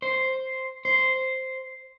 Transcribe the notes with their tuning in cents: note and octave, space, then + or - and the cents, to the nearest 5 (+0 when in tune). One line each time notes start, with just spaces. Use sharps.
C5 +0
C5 -5